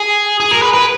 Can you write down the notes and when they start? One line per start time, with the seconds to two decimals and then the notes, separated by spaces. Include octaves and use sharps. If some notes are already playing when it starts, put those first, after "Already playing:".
Already playing: G#4
0.40 G#4
0.51 A#4
0.62 B4
0.73 B4